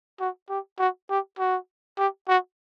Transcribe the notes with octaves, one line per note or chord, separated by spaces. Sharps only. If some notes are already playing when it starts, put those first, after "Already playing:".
F#4
G4
F#4
G4
F#4
G4
F#4